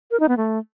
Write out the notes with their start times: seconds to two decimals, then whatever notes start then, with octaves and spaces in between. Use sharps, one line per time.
0.11 A#4
0.20 D#4
0.28 B3
0.37 A3